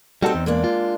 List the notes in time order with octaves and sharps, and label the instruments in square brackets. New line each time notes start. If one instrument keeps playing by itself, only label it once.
[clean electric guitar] G3 F#4 A4 [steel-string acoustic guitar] C4 D#4
[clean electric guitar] E2
[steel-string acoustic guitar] G#3 A#3 D4
[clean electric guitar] F4